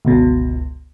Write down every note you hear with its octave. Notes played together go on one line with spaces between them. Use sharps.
G1 C#2 B2